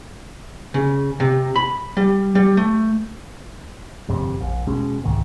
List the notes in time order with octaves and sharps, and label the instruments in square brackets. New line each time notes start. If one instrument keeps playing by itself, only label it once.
[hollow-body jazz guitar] C#3
C3
B5
G3
G3
A3
[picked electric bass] G1 F2 C3
A#1
E1 B2 G#3 C#4
D#1 C2 G#2 D#3